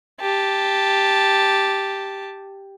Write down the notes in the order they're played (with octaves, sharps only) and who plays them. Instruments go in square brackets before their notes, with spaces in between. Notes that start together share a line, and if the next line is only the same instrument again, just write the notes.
[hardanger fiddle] G4 A5